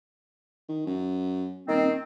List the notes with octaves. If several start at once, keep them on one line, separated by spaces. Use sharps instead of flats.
D#3
F#2
D#1 D#3 C4